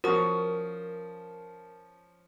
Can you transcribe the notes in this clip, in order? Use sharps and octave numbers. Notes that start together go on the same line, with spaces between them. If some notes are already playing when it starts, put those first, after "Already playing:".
F3 C#4 F#4 A#4 D#6